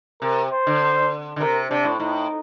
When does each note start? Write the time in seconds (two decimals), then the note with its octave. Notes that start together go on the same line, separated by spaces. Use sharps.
0.22 C3 A#4
0.52 C5
0.67 D3
1.36 D3
1.41 C3 A#4
1.70 C3 D4
1.85 A2
2.00 A2 D#4